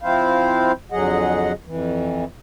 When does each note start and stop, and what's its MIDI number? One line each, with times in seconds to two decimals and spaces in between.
0.02 0.72 53
0.02 0.72 60
0.02 0.72 64
0.02 0.72 72
0.02 0.72 77
0.92 1.52 41
0.92 1.52 50
0.92 1.52 54
0.92 1.52 68
0.92 1.52 75
0.92 1.52 78
1.66 2.24 41
1.66 2.24 52